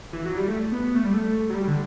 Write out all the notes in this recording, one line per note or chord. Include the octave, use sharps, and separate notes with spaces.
E3
F#3
G3
A3
B3
B3
A3
G3
A3
F#3
G3
D3